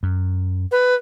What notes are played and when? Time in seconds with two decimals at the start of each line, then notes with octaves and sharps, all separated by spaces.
0.03 F#2
0.71 B4